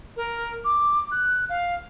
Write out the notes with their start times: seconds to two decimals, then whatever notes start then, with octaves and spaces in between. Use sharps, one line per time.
0.17 A#4
0.65 D6
1.11 F#6
1.49 F5